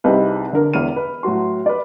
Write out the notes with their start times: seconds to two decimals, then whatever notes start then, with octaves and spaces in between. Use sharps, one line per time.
0.04 C2 C3 C4 D#4 G#4 B4
0.53 D3 A#4
0.74 E1 E2 E4 B5 F6 D#7
0.96 B4
1.23 A2 F#3 F#4 C6
1.66 B4 D5